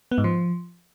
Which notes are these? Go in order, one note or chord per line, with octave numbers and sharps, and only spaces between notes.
B3
G#2
F3